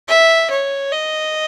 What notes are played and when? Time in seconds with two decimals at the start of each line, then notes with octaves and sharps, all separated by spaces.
0.09 E5
0.51 C#5
0.93 D#5